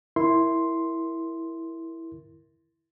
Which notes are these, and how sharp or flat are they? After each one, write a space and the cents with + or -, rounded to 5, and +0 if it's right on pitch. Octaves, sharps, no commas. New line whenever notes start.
E4 +0 A#4 +0 C6 +0